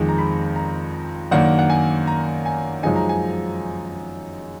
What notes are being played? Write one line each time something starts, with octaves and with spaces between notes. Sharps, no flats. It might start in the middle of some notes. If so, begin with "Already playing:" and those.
Already playing: F2 D#3 G#3 D6
A#5
B5
A#5
F#2 D#3 A#3 D4 F#5
F#5
G#5
A#5
G#5
F#2 F3 G#3 D#4 G#5
A#5
G#5